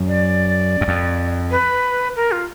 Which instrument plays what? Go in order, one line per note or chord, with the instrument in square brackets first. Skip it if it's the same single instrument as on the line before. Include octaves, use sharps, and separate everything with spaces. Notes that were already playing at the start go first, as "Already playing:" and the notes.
Already playing: [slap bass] F#2
[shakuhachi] D5
[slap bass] F#2
F2
[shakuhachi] B4
A#4
F4